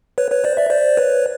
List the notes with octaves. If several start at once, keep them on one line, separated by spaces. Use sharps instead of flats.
B4 C#5
B4 C#5
C5 D5
D5 E5
C5 D5
B4 C#5